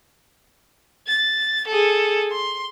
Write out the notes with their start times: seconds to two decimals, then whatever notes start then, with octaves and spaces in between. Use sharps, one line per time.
1.07 A6
1.67 G#4 A4
2.31 C6